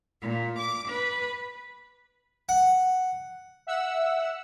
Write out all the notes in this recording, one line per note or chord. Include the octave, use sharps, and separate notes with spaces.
A#2
D6
B4
F#5
E5 F#5 E6